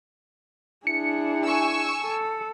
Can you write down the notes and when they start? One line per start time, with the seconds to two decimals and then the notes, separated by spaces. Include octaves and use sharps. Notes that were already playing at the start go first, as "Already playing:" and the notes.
0.87 D4 E4 G#4 C#7
1.44 G#5 C#6 E6
2.02 A4